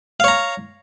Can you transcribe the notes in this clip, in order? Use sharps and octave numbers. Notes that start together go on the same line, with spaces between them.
C#5 F5 A#5